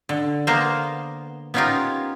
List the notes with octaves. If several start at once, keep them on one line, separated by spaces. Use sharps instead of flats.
D3
A#3 B3 A#4 C5
B3 C#4 D#4 F4 G4 A#4